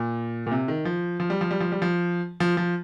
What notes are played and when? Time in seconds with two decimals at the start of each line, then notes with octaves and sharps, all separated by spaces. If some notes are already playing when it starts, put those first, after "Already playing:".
Already playing: A#2
0.47 A#2
0.51 C3
0.68 D#3
0.85 F3
1.20 F3
1.30 G3
1.41 F3
1.51 G3
1.60 F3
1.72 G3
1.82 F3
2.40 F3
2.57 F3